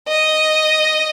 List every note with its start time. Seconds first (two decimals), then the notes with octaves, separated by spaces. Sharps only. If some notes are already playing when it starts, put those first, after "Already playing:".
0.08 D#5